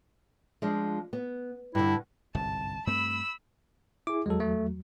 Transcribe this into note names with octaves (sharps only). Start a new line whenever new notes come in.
F3 G#3 D4
B3
G2 D3 E4
G1 C2 G#2 A5
G2 A3 C4 B5 E6
E4 G#4 D6
E2 F#3 G#3 A4
A3